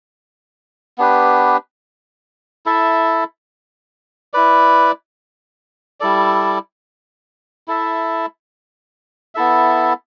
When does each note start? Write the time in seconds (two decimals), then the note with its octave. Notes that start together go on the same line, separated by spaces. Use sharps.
0.98 B3 D4 G4 B4
2.66 E4 A4 E5
4.34 E4 B4 D5
6.00 G3 E4 A4 D5
7.68 E4 A4 E5
9.35 B3 E4 A4 E5